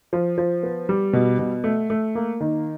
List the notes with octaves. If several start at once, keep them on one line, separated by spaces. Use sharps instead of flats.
F3
F3
B3
G3
B2
B2
A3
A3
A#3
D#3